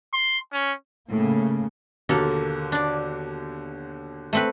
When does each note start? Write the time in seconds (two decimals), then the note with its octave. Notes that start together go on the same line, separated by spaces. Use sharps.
0.13 C6
0.53 C#4
1.10 A2 C#3 A#3
2.09 D#2 B2 D3 A#3 A4
2.72 D4 D5
4.33 A3 C4 B4